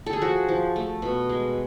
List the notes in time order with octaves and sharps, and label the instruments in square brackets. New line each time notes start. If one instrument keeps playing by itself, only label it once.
[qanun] A4
G#4
F3 F#4
F3
A3
B2
G#3